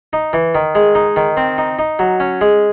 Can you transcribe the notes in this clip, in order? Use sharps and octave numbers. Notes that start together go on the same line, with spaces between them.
D#4
E3
D#3
G#3
D#4
D#3
C4
D#4
D#4
F#3
C#4
G#3